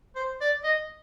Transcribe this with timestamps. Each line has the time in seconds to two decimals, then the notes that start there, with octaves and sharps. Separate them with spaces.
0.16 C5
0.41 D5
0.64 D#5